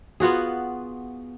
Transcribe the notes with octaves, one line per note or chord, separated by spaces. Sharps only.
B3 F4 F#4 G#4